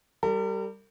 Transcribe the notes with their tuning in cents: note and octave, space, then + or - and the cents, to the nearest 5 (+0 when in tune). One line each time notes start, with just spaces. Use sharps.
G3 +0 A#4 -45